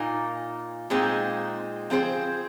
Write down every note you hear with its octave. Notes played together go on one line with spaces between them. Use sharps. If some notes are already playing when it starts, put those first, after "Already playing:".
Already playing: A#2 A#3 D#4
A#2 G#3 C4 D#4
F3 C4 G#4 C5